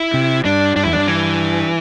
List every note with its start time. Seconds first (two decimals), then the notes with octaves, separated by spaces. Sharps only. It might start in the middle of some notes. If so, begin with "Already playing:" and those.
Already playing: E4
0.14 C3
0.45 G2 D4
0.76 G2 D4
0.85 E2 E4
0.93 G2 D4
1.08 E3